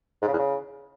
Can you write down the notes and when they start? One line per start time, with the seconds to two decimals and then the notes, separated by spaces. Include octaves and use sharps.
0.22 G#2
0.27 C#3
0.33 E2
0.38 C#3